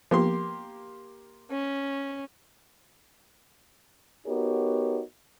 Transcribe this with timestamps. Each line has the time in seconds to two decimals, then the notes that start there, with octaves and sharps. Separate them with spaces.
0.11 F3 A#3 B3 G4 C6
1.51 C#4
4.27 B3 D#4 F#4 G4 A#4 C#5